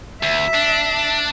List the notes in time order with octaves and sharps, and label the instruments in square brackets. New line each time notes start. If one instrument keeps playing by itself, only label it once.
[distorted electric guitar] D2 [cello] E5
[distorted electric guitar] D4